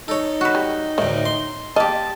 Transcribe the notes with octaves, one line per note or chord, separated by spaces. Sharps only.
D#4 A4 C#5
F#4 B4
G3
D2 A2 D#3
C6
A#3 G4 D#5 A5